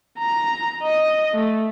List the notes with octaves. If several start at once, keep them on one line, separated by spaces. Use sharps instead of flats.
A#5
D#5
A3